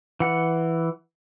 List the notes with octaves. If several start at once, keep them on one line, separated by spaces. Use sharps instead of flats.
E3 F#5